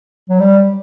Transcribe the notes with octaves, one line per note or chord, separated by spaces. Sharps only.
F#3
G3